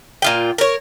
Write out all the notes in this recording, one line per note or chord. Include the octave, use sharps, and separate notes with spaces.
A#2 F4 G5
A#4 C#5